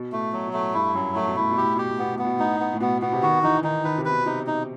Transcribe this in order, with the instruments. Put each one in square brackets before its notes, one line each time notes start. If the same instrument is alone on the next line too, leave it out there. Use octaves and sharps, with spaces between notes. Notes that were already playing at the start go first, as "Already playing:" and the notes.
Already playing: [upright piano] B2
[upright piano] A2 [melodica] A3
[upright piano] B2 [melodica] F#3
[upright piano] B2
[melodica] A3
[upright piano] A2
[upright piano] G2 [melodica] E4
[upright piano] F#2 [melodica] F#3
[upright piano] A2 [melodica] A3
[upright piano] B2
[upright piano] A2 [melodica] E4
[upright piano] B2
[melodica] G4
[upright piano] A2
[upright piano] B2 [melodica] G4
[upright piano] A2
[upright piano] B2 [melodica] B3
[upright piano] A2
[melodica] B3
[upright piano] B2
[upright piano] A2 [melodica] D#4
[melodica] B3
[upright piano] A2
[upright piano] B2 [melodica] B3
[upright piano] B2 [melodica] B3
[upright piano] C3
[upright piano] D#3 [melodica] F#4
[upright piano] E3 [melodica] D#4
[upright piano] D#3 [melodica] D#4
[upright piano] D#3 [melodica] B4
[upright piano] C3
[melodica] B4
[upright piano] B2
[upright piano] C3 [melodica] D#4
[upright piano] B2 [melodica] D#4